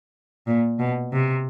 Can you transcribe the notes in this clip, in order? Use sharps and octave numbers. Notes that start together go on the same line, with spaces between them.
A#2
B2
C3